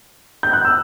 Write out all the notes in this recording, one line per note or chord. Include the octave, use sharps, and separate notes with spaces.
G6
F#6
E6